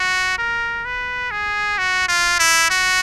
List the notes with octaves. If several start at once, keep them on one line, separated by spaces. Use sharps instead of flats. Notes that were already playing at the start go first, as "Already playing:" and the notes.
Already playing: F#4
A#4
B4
G#4
F#4
F4
E4
F#4